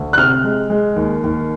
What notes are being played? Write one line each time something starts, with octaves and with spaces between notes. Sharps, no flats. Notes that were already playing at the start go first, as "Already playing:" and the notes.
Already playing: D2
F#6
C3 F6
G#3
G#3
D#2
D#2